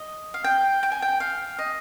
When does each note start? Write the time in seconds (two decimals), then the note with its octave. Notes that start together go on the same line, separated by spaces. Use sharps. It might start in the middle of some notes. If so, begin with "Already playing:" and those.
Already playing: D#5
0.34 F5
0.44 G5
0.83 G5
0.92 G#5
1.02 G5
1.20 F5
1.59 D#5